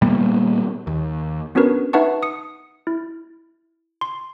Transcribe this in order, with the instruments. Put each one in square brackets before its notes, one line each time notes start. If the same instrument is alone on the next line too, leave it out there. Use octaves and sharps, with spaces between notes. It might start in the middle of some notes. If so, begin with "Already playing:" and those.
[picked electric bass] A#2 G3 A#3 B3
D#2
[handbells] B3 C#4 D4 F#4 A#4 B4
D#4 B4 E5 F#5 A5 C#6
D#6 C#7
E4
C6